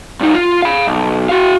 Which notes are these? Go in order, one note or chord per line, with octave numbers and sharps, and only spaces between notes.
G2 D#4
F4
F5 B5
B1
F#4 F5